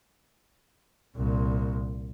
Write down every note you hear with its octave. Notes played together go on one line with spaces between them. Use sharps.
C2 A#2